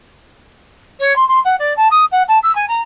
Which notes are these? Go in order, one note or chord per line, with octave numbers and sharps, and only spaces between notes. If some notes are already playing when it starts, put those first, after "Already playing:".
C#5
C6
C6
F#5
D5
A5
D#6
F#5
A5
E6
G#5
A#5